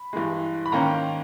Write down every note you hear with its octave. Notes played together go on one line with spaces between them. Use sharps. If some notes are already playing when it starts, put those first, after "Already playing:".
Already playing: B5
G2 E3 G#3
B5
G#2 D#3 A#3 C#4 G5 A#5